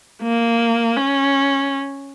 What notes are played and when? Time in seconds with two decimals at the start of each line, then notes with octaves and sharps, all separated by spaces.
0.22 A#3
0.97 C#4